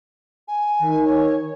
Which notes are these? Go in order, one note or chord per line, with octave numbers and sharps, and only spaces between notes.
G#5
D#3
C#5